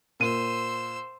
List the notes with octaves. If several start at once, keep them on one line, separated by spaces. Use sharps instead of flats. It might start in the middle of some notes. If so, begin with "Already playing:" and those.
A#2 C5 E6 D#7